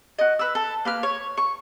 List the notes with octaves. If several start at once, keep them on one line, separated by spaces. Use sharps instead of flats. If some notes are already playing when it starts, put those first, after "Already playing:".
F#4 D#5
B4 E6
A4
A#3 B4 F6
C#5
C#6